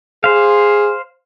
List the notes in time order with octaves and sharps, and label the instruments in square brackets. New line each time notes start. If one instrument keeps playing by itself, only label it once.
[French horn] G#4 [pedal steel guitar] C5 F5